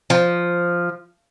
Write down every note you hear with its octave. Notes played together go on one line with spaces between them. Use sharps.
F3